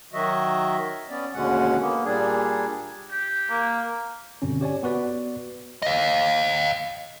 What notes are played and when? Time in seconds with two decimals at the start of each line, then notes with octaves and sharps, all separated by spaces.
0.13 D#3 F#3 F#4 D#5 E5
1.10 B3 C#4 D5
1.34 D#2 B2 D3 G#3 C#4 F#5
1.80 A#3 B3
2.04 A#2 G3 D4 G#4
3.12 G4
3.50 A#3
4.42 G2 B2 D3 C4 C#4
4.61 G4 C#5 D5 G#5
4.83 B3 F#4 B4 D5
5.82 D#5 F5